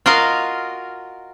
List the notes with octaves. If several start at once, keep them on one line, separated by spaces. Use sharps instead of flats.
F4 F#4 A#4 D#5 F5